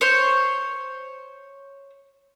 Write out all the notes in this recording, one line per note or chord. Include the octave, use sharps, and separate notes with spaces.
C5 C#5